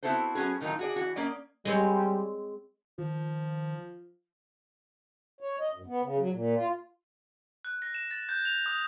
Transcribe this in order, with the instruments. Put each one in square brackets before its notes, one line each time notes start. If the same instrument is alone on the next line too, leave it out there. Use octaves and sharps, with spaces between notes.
[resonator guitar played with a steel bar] B3 C4 E4 F#4 A4 C5
F#3 B3 C#4 F#4 G#4
A2 D#3 F#3 C4 D#4 F4
F#4 G#4 D5
E3 F#4
A#3 C#4 D5 D#5
[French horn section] G3 [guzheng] G#3 C4 C#5
[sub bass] D#3 [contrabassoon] F3
[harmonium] C#5
D#5
F#2
B3
C#3
F#3
A#2
F4
[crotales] F#6
A#6
E7
A6
G6
F7
D#6